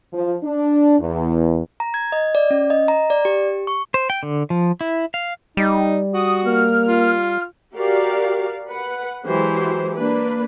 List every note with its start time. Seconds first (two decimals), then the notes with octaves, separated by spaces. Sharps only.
0.13 F3
0.44 D4
1.00 E2
1.80 A#5
1.94 G#6
2.12 D#5
2.35 D5
2.51 C#4
2.70 D#5
2.88 A#5
3.10 D5
3.25 G4
3.67 C#6
3.94 C5
4.10 G5
4.23 D3
4.50 F3
4.81 E4
5.14 F5
5.57 G3 D#4
6.14 F#4 D#6
6.45 A#3 F6
6.87 F4
7.74 F#4 G4 A#4 D5 F5
8.69 B4 F#5
9.26 E3 F#3 G#3 G4 C5
9.96 A#3 D4 B4